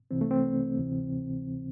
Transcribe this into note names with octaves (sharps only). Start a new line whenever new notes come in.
C2 C3 E3 C4
A3
C4
D2 C3 E3